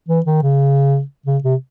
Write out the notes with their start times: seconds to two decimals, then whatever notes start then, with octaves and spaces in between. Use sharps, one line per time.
0.09 E3
0.26 D#3
0.42 C#3
1.26 C#3
1.43 C3